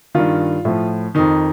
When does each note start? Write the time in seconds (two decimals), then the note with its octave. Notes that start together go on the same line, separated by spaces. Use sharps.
0.15 G2 D#3 F4
0.65 A2 F3
1.15 F2 D#3 D#4